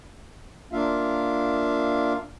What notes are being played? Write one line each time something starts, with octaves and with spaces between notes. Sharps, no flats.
A#3 D4 F4 E5 F5